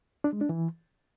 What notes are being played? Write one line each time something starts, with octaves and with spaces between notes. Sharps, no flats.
D4
G#3
D4
E3